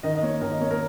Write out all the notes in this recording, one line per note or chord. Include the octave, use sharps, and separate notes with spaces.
D#3 D#5
D#5
A#3 C#5
D#3 A#4
D#5
A#3 C#5
A#4